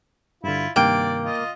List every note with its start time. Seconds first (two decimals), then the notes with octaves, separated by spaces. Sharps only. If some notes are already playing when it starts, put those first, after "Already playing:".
0.44 G2 D3 E4 F4
0.76 G2 C3 D#3 A#3 D5 G5
1.25 F4 D#5